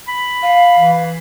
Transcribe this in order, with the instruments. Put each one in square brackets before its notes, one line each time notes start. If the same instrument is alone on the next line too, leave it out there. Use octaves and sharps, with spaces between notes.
[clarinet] B5
[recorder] F5
[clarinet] E3